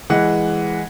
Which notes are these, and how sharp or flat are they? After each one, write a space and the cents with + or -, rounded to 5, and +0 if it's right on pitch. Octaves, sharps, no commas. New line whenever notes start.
E3 +0 G#3 -5 F#5 +0